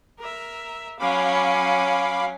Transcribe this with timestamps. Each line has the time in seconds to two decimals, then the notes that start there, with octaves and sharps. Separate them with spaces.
0.20 A#4 E5
1.00 F#3 C#4 F5 B5 D6